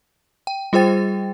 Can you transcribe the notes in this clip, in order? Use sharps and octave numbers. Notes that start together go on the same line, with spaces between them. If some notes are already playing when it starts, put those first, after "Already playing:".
G5
G3 F4 G#4 C5 G5 A6